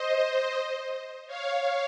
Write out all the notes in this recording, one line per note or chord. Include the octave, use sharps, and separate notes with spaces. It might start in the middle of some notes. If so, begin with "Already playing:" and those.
Already playing: C5 D#5
C#5 F5